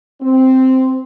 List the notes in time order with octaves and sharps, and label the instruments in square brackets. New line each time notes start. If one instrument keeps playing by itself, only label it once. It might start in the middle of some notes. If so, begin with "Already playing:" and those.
[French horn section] C4